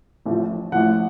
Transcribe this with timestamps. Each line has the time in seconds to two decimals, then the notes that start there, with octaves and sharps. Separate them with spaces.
0.26 A1 A2 F3
0.72 A1 A2 F3 F#5